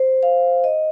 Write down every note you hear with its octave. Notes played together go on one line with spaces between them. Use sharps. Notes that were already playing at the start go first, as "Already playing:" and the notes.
Already playing: C5
F5
D#5